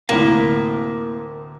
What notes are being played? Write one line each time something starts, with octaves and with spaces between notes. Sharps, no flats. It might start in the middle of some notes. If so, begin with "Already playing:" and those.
D2 A2 C3 A#3 E4 A#4 F5